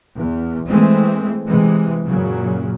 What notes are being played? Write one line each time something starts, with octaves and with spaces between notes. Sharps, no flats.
E2
E3 G#3 A3 C4
C3 E3 G#3
F#2 A#2 C#3 F#3